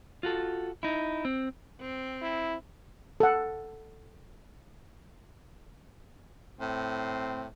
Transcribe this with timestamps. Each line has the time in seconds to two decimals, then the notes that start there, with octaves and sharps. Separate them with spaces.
0.23 F4 F#4 A4
0.83 D#4 E4
1.25 C4
1.81 C4
2.22 E4
3.20 A4 F#5
6.60 A2 C4